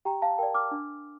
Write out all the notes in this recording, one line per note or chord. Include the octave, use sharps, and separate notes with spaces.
G4 G5 A#5
F5 A5
A#4 D5 G5
D6 F6
D4